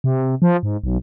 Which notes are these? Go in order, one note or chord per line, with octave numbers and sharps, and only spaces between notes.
C3
F3
G#2
B1